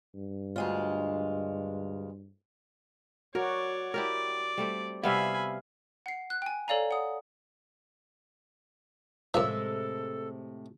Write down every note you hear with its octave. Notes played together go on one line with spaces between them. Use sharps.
G2
D2 G#3 F4
F#4 A#4 C#5 D5
E4 G4 A#4 D5
G3 A3 C4
C3 G3 B3 E5 F5 G#5 B5
F#5 C7
F#6
G5 G#5
A4 C#5 D5 F5 G#5 A#5
F#5 D#6
F#2 A2 C3 F3 G#3 A4 E5